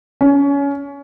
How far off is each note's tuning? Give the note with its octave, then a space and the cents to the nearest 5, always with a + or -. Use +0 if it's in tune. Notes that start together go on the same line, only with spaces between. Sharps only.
C#4 +25